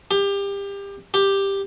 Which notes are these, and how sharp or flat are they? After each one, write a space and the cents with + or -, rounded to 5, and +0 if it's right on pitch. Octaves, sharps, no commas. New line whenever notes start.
G4 +25
G4 +5